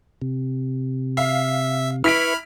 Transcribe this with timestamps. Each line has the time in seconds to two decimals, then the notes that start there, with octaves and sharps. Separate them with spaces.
0.22 C3
1.17 E5 F5
2.04 E4 B4 B5 C#6 F6 B6 D7